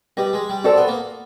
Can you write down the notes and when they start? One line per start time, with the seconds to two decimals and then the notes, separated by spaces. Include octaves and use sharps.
0.17 G3 G4 B4 D#5
0.33 G#3
0.49 G3
0.64 C4 F#4 A4 D5
0.77 B3
0.88 A#3